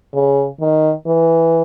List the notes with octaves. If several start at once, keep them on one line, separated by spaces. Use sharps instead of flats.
C#3
D#3
E3